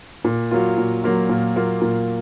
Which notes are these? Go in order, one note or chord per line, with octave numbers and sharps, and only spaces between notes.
A#2
F#3 A#3 F4
A#2
F#3 A#3 F4
A#2
F#3 A#3 F4
A#2